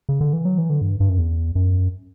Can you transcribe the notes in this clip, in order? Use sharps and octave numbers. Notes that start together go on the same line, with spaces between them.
C#3
D3
E3
F#3
E3
D3
G2
G2
F#2
E2
F#2